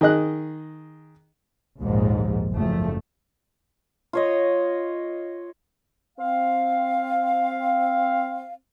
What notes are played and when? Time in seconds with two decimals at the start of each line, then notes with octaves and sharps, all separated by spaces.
0.01 D#3 G#4 D#5 F#6
1.80 A#1 D#2 G#2 F3
2.52 F#1 F#2 F3 A3
4.13 F4 C#5 D#5
6.18 C4 F5